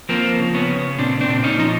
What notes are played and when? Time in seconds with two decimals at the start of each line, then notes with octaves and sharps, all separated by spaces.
0.09 F3 A#3 C4
0.39 C#3
0.54 B3 C#4
0.68 C#3
0.98 A#2 C4 D4
1.21 C4 D4
1.28 A#2
1.44 C#4 D#4
1.58 F3 D#4